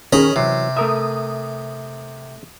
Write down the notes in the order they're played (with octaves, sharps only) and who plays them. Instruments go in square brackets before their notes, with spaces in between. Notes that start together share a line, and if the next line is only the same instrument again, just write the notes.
[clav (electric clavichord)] D#3 [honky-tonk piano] C#4 G#4 [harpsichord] D#5 A#5 B5
[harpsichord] C3 [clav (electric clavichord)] E3 F#3 [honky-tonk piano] C7
[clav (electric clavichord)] A3 A#4 E5 [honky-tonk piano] D#6